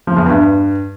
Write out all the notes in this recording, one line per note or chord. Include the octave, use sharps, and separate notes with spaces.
F3
E2
G2